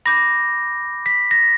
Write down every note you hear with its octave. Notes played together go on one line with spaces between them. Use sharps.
B5 D6 G6 A#6
B6
A#6